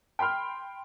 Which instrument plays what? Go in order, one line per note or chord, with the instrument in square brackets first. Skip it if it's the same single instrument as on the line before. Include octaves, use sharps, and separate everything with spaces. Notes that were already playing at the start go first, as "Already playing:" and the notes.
[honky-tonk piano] G5 B5 C6 F6